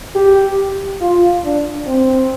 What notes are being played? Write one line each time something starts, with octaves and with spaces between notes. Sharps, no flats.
G4
F4
D4
C4